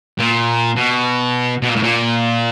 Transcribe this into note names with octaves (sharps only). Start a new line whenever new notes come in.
A#2
B2
B2
A#2
A2
A#2